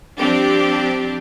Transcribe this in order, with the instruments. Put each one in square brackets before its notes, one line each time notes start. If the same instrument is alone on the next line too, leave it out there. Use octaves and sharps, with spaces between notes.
[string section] F3 G3 C4 D4 G4